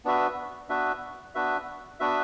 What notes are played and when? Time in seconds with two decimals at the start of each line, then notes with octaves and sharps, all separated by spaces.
0.05 B3 D4 F#4 B4 E5
0.69 B3 D4 F#4 B4 E5
1.35 B3 D4 F#4 B4 E5
2.00 B3 D4 F#4 B4 E5